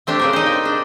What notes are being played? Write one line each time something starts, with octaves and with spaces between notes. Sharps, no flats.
A3 C4 D4 G4
C#3 C4 A#4
D#4 C5
G5
D4